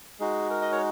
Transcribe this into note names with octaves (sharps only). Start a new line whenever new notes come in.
G#3 D#4 F#4 G#4
A#4
D#5
C#5